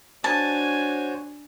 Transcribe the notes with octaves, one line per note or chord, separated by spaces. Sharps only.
D4 F#4 C5 C#5 G#5 A5